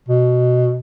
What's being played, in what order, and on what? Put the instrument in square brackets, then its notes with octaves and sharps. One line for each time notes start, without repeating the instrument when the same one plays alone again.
[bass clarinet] B2